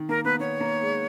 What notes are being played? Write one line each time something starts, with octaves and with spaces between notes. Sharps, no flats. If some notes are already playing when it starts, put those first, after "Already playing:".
Already playing: D#3
A#3 A#4
B3 B4
B3 C#5
A#3
G#3